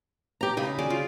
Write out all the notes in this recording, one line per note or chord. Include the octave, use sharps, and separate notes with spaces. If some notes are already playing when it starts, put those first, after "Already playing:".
G4 A#5
C#3 D#5 E5 B5
F#3 G#4 D5
F4